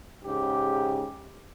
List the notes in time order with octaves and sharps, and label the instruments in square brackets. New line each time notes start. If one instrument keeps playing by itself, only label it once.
[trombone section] G#2 C#3 G4